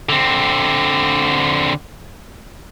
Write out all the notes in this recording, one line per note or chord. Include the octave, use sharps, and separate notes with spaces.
D3 C4